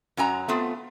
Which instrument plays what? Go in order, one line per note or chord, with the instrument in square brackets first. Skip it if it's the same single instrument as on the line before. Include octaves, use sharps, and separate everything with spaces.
[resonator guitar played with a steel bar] F#2 F#3 G#5 A#5
A3 B3 C4 F4